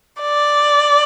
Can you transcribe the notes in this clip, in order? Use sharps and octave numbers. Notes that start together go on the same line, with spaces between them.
D5